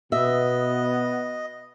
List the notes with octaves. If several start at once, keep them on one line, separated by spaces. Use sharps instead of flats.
B2 B3 D#5 E5